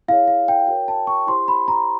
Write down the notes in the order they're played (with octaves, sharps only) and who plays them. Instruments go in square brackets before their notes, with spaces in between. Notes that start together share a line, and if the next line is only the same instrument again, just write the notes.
[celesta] E4 G#4 C#5 F5
F5
G5
F#4 A#4 C#5 G5
A5
C#6
E4 G4 C5 C6
B5
A#5